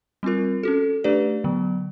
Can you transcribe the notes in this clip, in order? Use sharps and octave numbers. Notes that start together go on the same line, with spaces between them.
G3 C4 F4 A#4
C#4 F#4 A4
A3 D4 G4 B4 D5
D3 F#3 B3